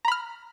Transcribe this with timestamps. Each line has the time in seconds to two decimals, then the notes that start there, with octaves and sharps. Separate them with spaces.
0.05 A#5
0.08 B5
0.12 F6